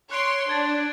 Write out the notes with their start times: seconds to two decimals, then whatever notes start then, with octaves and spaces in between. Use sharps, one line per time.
0.11 C#5 C6 F#6 D7
0.50 D4 G#6 A6